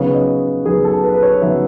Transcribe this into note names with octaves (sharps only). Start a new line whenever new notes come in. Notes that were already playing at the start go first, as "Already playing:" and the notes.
Already playing: C#3 F#3 B3 D#4 C#5
D#5
C#3 F#3 B3 D#4 G#4
A4
B4
B4
C#5
C#3 F#3 B3 D#4 E5